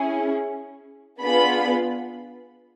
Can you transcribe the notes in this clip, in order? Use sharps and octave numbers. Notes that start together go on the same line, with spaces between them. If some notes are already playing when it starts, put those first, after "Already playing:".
Already playing: C#4 E4 G#4
B3 D4 F4 G#4 B5